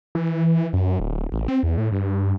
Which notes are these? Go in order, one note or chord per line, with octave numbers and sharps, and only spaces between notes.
E3
F#2
D1
A1
C4
E2
A2
G2